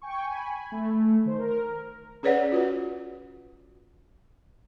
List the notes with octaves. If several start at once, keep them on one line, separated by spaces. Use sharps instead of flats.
G5 G#5 C#6
G#5 B5
A3
D#3 C5
A#4
C#4 G#4 B4 C#5 D5 F#5
F4 F#4 B4